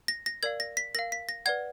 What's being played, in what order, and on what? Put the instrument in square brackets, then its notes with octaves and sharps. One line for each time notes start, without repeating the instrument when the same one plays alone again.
[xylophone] A#6
A#6
A#4 D5 F5 G#6
A#6
B6
A#4 F5 A#6
B6
A#6
B4 D5 F#5 G#6